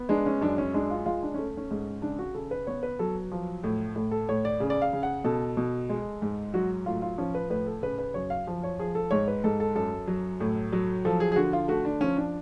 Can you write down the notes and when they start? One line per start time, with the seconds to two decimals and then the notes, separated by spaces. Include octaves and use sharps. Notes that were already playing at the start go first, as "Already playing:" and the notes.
Already playing: B3
0.09 G#3 D4
0.26 C#4
0.41 F#2 D4
0.58 C#4
0.74 G#3 D4
0.91 F4
1.06 G#3 F4
1.23 D4
1.34 A3 C#4
1.57 C#4
1.71 G#2
2.02 C#3 D4
2.19 F#4
2.34 C#3 A4
2.51 B4
2.67 B3 C#5
2.83 B4
2.99 F#3 A4
3.31 F3
3.64 A2
3.96 A2
4.11 A4
4.29 A2 C#5
4.45 D5
4.60 C#3
4.70 D5
4.82 F5
4.93 C#3
5.03 F#5
5.24 B2 A4
5.57 B2
5.89 G#3
6.22 G#2
6.54 F#3 F#4
6.86 A2 F4
7.02 F4
7.18 F3 C#4
7.35 B4
7.50 A2 B4
7.66 A4
7.82 C#3 B4
7.99 B4
8.14 F#2 C#5
8.30 F5
8.47 F3
8.63 C#5
8.79 F3 G#4
8.95 A4
9.11 G#2 C#5
9.28 B4
9.44 G#2 A4
9.60 A4
9.75 F#2 A4
10.07 F#3
10.40 A2
10.72 F#3
11.05 F3 A4
11.20 G#4
11.32 G#4
11.36 D3 F#4
11.53 F4
11.68 A3 F#4
11.85 D4
12.01 F3 C#4
12.17 D4